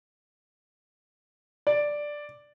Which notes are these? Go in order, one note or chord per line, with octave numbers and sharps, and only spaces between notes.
D5